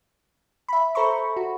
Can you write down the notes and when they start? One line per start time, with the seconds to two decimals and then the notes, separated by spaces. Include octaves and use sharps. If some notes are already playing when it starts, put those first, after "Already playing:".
0.68 E5 B5
0.95 A4 C5 A#5 B5 C#6
1.37 F#4